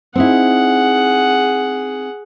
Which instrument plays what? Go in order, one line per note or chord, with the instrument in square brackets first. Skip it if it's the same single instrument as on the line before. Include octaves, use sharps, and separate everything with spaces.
[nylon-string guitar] C4 D#4 E4 [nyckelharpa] G#4 F#5